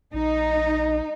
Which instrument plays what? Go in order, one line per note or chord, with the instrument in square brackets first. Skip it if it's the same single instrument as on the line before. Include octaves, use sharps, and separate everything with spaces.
[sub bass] A#1 [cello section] D#4